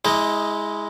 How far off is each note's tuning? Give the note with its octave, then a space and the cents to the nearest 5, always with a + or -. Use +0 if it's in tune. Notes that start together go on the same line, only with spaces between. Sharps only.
G#3 +0 E4 -25 D#5 +0